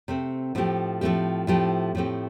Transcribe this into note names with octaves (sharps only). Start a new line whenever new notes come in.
C3 A3 C4
A2 F3 A3 C4 G4
A2 F3 A3 C4 G4
A2 F3 A3 C4 G4
A2 F3 A3 C4 G4